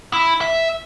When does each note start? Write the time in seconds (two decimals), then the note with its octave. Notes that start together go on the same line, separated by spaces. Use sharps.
0.13 E4
0.41 E5